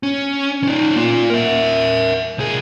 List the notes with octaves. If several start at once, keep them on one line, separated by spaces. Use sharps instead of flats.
C#4
C#4 D#4
A#3 F4
A#4 E5
C2 G#4